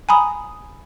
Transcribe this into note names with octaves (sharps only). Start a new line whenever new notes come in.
G#5 A#5 B5 D#6